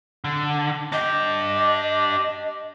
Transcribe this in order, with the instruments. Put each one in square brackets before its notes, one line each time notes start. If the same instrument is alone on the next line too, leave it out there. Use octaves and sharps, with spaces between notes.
[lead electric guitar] D3
[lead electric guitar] D4 G4 [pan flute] D#5